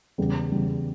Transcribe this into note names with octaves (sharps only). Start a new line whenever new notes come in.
E2 C#3 G3
E2 C#3 G3